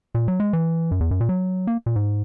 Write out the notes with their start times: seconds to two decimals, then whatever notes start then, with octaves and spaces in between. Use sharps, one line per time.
0.15 A#2
0.28 F#3
0.40 G#3
0.53 E3
0.91 F#2
1.00 E2
1.11 F#2
1.21 A#2
1.29 F#3
1.67 A#3
1.86 A#2
1.96 G#2